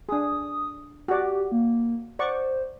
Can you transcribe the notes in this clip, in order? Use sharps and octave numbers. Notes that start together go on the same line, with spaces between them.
D4 G#4 D#6
F#4 G4 D5
A#3
C5 D5 F#5 C#6